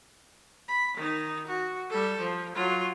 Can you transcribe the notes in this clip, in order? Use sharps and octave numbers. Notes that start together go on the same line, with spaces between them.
B5
D#3 D#4
F#4
G3 A4
F3
F#3 F4